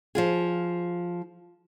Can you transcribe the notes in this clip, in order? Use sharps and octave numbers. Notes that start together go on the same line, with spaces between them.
F3 F4 G#4